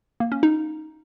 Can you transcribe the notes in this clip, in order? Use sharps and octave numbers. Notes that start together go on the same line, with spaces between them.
A#3
C#4
D#4